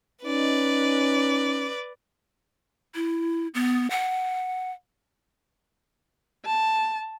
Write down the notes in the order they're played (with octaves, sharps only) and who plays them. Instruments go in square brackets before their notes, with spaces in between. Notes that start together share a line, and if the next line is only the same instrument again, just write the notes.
[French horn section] C#4 D#4 [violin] B4 D5
[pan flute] E4
B3
F#5
[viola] A5